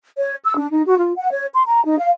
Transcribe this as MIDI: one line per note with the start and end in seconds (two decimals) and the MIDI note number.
0.17 0.35 73
0.44 0.54 88
0.57 0.68 62
0.72 0.85 63
0.86 0.98 66
0.99 1.12 65
1.18 1.31 78
1.31 1.45 73
1.53 1.63 84
1.66 1.84 82
1.85 1.97 63
1.99 2.10 77